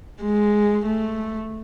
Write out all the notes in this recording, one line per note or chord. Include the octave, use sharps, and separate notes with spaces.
G#3
A3